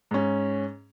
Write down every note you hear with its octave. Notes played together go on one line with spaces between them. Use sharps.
G#2 C#4